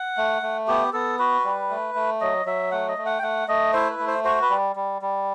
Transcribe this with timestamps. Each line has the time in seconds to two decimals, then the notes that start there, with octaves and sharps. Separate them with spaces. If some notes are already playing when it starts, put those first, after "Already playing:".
Already playing: F#5
0.17 A3
0.42 A3
0.67 B3 G4
0.93 B3 A4
1.19 F#4 B4
1.44 G3
1.70 A3
1.95 A3
2.21 F#3 D#5
2.46 F#3 E5
2.71 A3 F#5
2.88 D#5
2.98 A3
3.06 F#5
3.18 G5
3.22 A3 F#5
3.48 A3 D#5
3.73 E4 C5
3.90 B4
3.99 A3
4.07 C5
4.24 F#4 C5
4.42 B4
4.50 G3
4.76 G3
5.02 G3